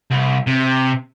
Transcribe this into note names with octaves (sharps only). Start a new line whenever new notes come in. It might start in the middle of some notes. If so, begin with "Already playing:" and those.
C2
C3